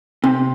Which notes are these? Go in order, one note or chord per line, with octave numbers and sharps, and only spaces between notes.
C3